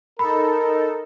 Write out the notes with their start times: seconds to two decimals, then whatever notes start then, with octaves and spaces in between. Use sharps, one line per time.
0.19 D#4 A4 A#4 B5